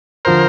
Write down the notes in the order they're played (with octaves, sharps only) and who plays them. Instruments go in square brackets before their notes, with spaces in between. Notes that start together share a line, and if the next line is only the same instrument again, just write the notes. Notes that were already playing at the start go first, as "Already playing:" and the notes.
[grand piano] D3 F3 [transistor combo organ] A#4 C5